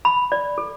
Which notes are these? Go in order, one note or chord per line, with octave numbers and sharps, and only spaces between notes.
B5
D5
A4